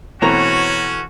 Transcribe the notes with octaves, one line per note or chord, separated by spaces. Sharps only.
B2 E3 A3 C4 C#4 F#4 C#5 A#5